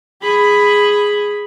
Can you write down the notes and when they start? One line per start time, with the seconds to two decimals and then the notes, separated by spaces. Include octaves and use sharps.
0.22 G#4 B5